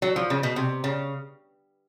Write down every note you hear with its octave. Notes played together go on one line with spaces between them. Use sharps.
F#3
F3
C#3
B2
C3
C#3